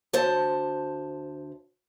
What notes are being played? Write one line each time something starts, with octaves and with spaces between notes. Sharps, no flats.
D2 C5 A5